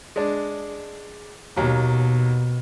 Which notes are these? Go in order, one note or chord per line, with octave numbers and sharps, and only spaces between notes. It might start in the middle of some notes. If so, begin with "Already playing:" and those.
G#3 D4
D#2 B2 F#3 A#3